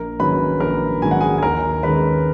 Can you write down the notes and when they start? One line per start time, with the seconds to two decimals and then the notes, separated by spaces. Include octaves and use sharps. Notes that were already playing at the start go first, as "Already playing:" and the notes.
Already playing: A#1 A#4
0.20 G#2 D#3 F#3 C#4 B4 B5
0.60 A#1 A#4 A#5
1.02 G#2 D#3 F#3 C#4 G#5
1.11 F#5
1.21 G#4 G#5
1.38 G#5
1.42 D#2 A#4 A#5
1.83 D#3 G#3 C#4 B4 B5